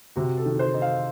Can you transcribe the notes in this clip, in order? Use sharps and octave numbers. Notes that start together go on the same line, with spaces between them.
C3 F#4
A4
D#3
C5
D#4
F5